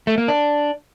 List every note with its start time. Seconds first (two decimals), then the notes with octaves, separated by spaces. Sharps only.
0.07 A3
0.18 A#3
0.28 D4